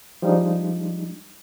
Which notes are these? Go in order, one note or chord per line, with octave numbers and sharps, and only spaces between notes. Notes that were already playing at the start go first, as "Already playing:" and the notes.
F3 G3 G#3 D4 D#4